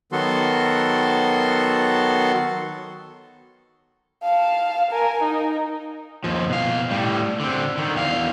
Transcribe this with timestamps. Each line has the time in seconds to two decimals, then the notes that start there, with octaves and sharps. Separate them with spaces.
0.12 D#3 F#3 B3 F#4 A4 C6
4.24 F5 A5
4.91 A#4 G#5
5.23 D#4
6.24 D#2 F3
6.50 B2 F5
6.91 A2 G3
7.40 D3 C4
7.77 D3 D#3
7.95 E2 F5